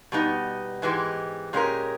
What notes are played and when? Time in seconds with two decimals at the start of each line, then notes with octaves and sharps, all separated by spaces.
0.12 B2 G3 B3 D#4
0.82 G#2 E3 G#3 B3 G4
1.53 A#2 G#3 C#4 G4 A#4